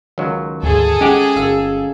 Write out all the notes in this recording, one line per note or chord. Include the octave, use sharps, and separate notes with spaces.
C#2 D#3 F#3
D2 G#2 G#4 A4
G#3 C#4 G4 F#5
G1 F5 E6